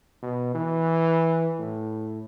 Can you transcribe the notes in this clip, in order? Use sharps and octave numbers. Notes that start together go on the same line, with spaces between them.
B2
E3
A2